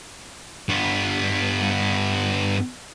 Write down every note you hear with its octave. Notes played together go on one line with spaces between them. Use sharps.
G2 B3